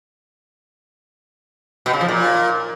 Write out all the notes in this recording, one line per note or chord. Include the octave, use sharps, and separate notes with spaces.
B2
C#3
F3
A#2